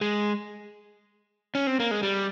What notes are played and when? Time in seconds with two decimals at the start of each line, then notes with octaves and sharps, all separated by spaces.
0.01 G#3
1.55 C#4
1.67 C4
1.80 A#3
1.91 G#3
2.03 G3